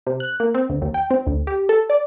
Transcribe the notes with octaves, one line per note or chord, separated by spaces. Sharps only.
C3
F#6
A#3
C4
D2
D#2
G5
C4
D2
G4
A4
D5